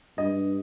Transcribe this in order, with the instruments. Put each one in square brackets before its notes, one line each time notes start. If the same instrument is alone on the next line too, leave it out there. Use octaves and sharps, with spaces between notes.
[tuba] G2 [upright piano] D#5